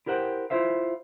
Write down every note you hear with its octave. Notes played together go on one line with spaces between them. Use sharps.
E4 G4 A#4 C5 F#5 G5
E4 F4 C5 E5 F5